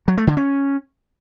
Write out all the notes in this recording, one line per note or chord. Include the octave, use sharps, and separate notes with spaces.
F#3
A3
D3
C#4